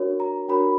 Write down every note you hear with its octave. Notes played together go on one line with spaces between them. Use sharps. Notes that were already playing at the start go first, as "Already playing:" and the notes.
Already playing: D4 F#4 A#4 C#5
A#5
D4 F#4 A#4 C#5 B5